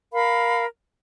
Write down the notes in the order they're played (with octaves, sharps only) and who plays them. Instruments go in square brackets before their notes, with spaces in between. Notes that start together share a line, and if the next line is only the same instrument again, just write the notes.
[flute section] A#4 F5 B5